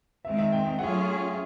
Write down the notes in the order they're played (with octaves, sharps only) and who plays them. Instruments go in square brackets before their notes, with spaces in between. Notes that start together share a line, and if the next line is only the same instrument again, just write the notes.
[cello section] D#3 G#3 C4 [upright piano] E5
[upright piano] E5
G5
G5
[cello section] F#3 A3 C#4 F4 G#4 [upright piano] F#5